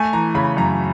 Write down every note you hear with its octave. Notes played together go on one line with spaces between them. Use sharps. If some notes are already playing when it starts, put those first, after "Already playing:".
Already playing: A3 G#5
E3 A#5
C#3 B5
F#2 A#5